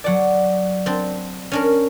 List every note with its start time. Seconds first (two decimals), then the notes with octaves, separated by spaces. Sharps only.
0.04 F#3 D5 F#5 A5
0.86 C4 D4
1.52 C#4 D4 A#4